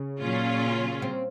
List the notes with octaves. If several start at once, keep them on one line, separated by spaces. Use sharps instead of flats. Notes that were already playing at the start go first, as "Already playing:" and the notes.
Already playing: C#3
A#2 F#3 C#4 F4
C4